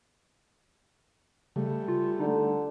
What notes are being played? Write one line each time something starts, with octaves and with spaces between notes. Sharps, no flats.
C#3 G3 A3
F4
D3 D#4